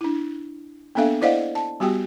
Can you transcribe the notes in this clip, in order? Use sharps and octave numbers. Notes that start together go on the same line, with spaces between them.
D4 E4
A#3 B3 D4 A4 E5 F5
E4 C5 D5 D#5 F5 F#5
A5
G3 B3 F#4 G4 G5